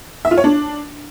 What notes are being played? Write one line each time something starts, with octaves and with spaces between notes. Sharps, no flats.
E5
F4
C#5
D4